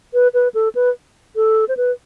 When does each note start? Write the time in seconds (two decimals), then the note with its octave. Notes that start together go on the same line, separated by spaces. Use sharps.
0.14 B4
0.34 B4
0.54 A4
0.75 B4
1.36 A4
1.69 C5
1.77 B4